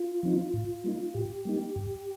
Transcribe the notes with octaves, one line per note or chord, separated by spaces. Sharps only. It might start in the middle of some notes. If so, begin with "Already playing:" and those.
Already playing: F4
F3 C4 D#4
A2
G3 A#3 D#4
A2 G4
G3 A#3 D#4
G2